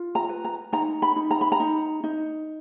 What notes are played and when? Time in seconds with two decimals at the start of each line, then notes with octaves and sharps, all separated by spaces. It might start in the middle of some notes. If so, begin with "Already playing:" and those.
Already playing: F4
0.15 A#5
0.29 B4
0.44 A#5
0.73 D#4 A#5
1.02 B5
1.16 D#4
1.31 A#5
1.41 B5
1.52 A#5
1.60 D#4
2.04 D#4